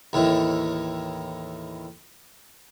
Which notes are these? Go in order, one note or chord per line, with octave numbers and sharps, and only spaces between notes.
D#2 A2 D#3 E3